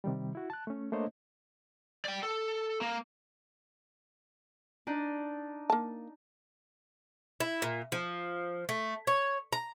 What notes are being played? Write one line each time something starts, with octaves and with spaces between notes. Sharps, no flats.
C3 D#3 G3
E4 F#4
A5 F#6
A3 C#4
A3 A#3 D4 C5 C#5 D#5
D5 G5
A4
A#3
D4 D#4
A#3 A5
E4
A#2
F3
A3
C#5
A#5